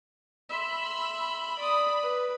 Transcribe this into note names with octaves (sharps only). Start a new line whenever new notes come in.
E5 B5 C6 E6
B5
D5 D#6
B4